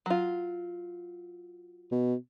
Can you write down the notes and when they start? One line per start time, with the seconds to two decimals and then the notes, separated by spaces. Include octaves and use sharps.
0.06 F#3 F4
1.91 B2